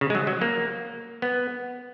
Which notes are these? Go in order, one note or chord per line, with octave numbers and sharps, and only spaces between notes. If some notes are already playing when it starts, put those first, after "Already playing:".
C#3
G#3
F#3
F#3
A#3
B3